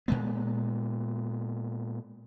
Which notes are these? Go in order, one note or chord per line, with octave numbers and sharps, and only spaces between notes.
A#2 G#3 B3